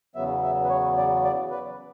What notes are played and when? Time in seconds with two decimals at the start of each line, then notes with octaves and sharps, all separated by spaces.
0.15 E2 C#3 F#3 B3 E5
0.43 E5
0.64 B4
0.69 C#5
0.97 D5
1.24 D5
1.51 B4